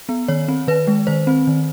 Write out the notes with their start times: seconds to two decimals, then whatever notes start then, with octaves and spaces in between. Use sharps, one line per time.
0.09 B3
0.28 D#3 C#5
0.48 C4
0.68 D#3 B4
0.87 G#3
1.07 D#3 C5
1.27 C4
1.47 D#3